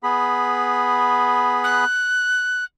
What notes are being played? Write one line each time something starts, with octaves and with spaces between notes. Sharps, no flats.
B3 G#4 B5
F#6